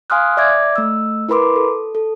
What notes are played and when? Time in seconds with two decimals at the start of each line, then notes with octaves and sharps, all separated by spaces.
0.10 F5 G#5 C6 D#6 F6 F#6
0.37 D5 E5 D6 G#6
0.76 A3 E6
1.29 E4 A#4 B4 B5 C6 D6
1.56 A4
1.95 A4